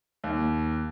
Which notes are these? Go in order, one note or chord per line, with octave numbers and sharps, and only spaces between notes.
D#2